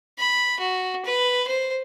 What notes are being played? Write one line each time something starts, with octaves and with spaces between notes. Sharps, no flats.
B5
F#4
B4
C5